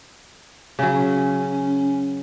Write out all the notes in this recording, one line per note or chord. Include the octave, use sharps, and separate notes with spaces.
C#3 F#3 C#4